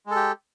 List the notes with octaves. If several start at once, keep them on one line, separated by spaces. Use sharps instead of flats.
G#3 G4 A4